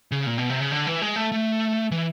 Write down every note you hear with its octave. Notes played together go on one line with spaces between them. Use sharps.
C#3
A#2
B2
C3
C#3
D3
E3
G#3
A3
A3
E3